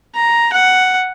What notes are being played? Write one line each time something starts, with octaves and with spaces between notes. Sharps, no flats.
A#5
F#5